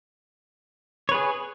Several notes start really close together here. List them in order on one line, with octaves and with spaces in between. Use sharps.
C#5 B4 G#4